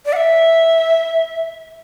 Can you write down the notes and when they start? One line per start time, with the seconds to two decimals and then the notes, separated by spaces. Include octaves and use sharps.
0.05 D5
0.13 F#5
0.16 E5